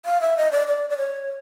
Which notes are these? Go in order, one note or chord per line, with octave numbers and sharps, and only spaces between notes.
F5
E5
D#5
D5
D5
D5
C#5